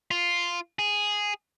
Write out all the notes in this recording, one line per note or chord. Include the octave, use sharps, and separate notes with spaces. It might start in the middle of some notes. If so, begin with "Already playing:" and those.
F4
G#4